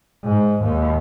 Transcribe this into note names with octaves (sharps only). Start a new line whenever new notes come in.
G#2
D#2